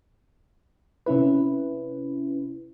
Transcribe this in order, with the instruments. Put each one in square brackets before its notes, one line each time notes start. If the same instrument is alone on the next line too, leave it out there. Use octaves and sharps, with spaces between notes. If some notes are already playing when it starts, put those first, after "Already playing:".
[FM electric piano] C3 C#4 E4 B4